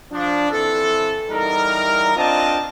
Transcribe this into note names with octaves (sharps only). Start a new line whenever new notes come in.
F3 D4
E3 C4 A4
E2 G3 D#4 A#4
C4 D4 F4 D#5 A5